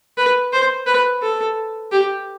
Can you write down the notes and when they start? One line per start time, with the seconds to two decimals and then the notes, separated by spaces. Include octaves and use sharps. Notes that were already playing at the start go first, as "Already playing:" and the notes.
0.18 B4
0.53 C5
0.87 B4
1.22 A4
1.92 G4